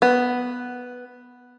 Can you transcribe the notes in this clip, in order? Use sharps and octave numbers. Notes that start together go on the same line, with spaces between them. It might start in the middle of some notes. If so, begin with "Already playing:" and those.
B3